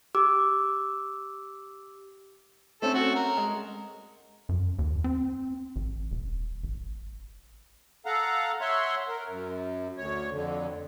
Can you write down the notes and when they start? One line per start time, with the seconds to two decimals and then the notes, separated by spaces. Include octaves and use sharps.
0.15 G4 D6 E6
2.82 A3 C4 C#4 A4
2.95 F#4
3.16 A#4
3.37 G#3
4.49 F#2
4.79 D#2
5.04 C4
5.76 A1
6.12 E1
6.64 A1
8.06 A4 F5 F#5 A#5
8.61 C#5 E5 F#5 C6
9.08 A#4
9.28 F#2
9.98 D2 C#5
10.32 F2 D3